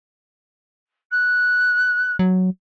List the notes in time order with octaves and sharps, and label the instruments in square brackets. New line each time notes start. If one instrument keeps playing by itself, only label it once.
[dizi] F#6
[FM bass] F#3